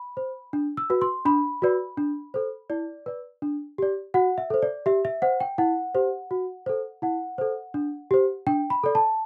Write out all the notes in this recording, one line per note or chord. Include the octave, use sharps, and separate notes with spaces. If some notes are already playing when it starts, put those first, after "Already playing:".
Already playing: B5
C5
D4
E6
F#4 B4
C6
D4 B5
F#4 B4 D5
D4
A4 C5
E4 D5
B4 D5
D4
G4 D5
F#4 F#5
E5
A4 C5
D5
G4 E5
E5
C5 F#5
G5
E4 F#5
G4 C5
F#4
A4 C5
E4 F#5
A4 C5
D4
G4 C5
D4 G5
B5
A4 D5
A5